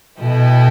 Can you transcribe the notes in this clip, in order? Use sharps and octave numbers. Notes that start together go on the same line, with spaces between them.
B2 E4 A4 D#5 G5